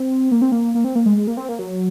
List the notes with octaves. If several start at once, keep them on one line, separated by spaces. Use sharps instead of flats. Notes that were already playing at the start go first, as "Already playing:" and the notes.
Already playing: C4
A#3
C4
A#3
A#3
C4
A#3
G#3
G#3
A#3
C4
A#3
F#3